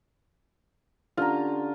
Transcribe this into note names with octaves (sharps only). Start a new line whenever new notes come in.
D3 C#4 D4 F4 G4 A#5 F6